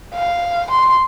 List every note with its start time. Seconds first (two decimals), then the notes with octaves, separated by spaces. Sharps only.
0.14 F5
0.71 C6